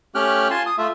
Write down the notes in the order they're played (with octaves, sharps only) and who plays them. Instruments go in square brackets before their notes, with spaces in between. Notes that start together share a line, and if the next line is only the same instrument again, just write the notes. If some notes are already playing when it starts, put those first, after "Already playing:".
[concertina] A3 C#4 G4 G5 F6 F#6
F4 G#5 A5 C6
D#6
A3 F4 E5